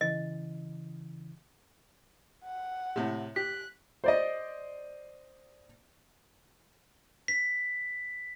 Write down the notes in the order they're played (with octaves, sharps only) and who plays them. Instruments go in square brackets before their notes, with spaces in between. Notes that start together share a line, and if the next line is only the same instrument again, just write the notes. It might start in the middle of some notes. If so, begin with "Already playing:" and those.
[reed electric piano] C#3 E3 [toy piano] D#5
[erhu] F#5
[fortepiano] A2 C3
[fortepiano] G4 [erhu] F#6 [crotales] B6
[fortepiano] C5 D5 D#5
[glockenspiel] B6